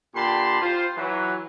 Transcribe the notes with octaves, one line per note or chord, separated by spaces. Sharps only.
A#2 D3 G4 A5 B5 C6
F4 C5
E3 F#3 B4